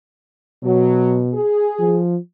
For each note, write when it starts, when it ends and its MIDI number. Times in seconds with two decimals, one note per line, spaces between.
0.63 1.38 47
0.63 1.19 54
1.34 1.98 68
1.79 2.17 53